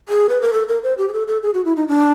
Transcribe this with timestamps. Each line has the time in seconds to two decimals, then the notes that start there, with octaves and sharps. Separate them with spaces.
0.09 G#4
0.29 B4
0.41 A#4
0.53 A4
0.68 A#4
0.83 C5
0.98 G4
1.08 G#4
1.13 A4
1.28 A4
1.43 G#4
1.54 F#4
1.65 E4
1.76 D#4
1.88 D4